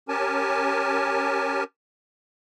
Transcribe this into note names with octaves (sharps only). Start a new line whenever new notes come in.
C#4 G4 A#4 G#5 A5